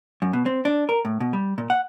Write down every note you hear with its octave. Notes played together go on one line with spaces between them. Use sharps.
F#2
B2
C4
D4
A#4
A2
B2
G3
A#2
F#5